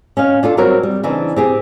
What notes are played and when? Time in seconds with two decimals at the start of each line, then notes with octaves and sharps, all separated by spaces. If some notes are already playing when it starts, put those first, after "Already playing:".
0.17 C#4 D#5 F5
0.43 D4 F4 A4 D5
0.57 F#3 G3 C4 F#4 A#4 C#5
0.83 G3
1.03 C#3 E3 C4 D4 D#4
1.36 C4 G4 G#4